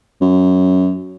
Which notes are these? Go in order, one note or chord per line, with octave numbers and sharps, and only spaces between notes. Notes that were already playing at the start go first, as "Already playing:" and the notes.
F#2